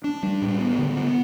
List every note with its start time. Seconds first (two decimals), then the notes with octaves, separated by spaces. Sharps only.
0.04 D4
0.23 G3
0.42 A2
0.60 B3
0.78 D3
0.97 B3